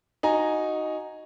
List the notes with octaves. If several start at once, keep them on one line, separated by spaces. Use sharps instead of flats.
D#4 F#4 G#5 A#5